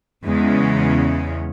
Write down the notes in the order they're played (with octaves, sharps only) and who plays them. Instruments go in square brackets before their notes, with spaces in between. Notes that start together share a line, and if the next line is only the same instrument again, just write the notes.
[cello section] E2 C#3 G#3 C#4